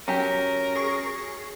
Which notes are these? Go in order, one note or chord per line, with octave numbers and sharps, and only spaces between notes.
F#3 C#4 G4 A#4
G#4 C#6